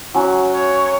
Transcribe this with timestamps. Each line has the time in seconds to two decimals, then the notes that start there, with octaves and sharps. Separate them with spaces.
0.15 F#3 C#4 F#4
0.55 C#5